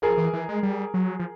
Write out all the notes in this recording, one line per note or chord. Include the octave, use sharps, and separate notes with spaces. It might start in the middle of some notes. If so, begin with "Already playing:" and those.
F3 G#4 A#4
E3
E3
G#3
G3
F#3
F3